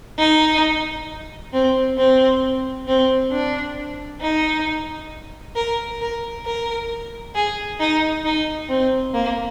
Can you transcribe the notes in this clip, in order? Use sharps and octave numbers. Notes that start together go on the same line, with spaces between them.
D#4
C4
C4
C4
D4
D#4
A#4
A#4
A#4
G#4
D#4
D#4
C4
A#3